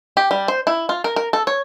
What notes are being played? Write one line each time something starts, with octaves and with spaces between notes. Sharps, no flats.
G4
G3
C5
E4
F4
A#4
A#4
A4
C#5